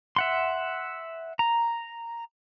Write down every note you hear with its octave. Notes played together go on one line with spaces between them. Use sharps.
E5 F#5 C6
A#5